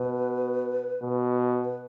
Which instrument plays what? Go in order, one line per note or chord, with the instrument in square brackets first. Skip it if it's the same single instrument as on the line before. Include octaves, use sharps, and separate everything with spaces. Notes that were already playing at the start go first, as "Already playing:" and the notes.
Already playing: [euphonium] B2 [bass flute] B4
[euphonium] B2
[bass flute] B4